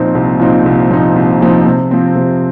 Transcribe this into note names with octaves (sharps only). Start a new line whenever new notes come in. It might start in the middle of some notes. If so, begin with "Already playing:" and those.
Already playing: A#2 F3 C4 D#4
C2
A#2 F3 C4 D#4
C2
A#2 F3 C4 D#4
C2
A#2 F3 C4 D#4
C3
F3 C4
C3